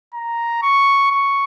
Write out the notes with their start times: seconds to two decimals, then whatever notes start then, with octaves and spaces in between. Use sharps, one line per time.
0.14 A#5
0.63 C#6
1.11 C#6